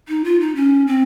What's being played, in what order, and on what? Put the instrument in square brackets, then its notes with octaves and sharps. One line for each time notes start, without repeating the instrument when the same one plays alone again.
[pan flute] D#4
F4
D#4
C#4
C4